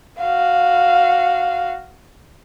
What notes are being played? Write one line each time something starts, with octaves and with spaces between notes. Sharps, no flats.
F#4 F5